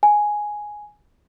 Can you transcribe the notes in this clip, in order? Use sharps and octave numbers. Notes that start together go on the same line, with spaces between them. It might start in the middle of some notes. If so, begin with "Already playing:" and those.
G#5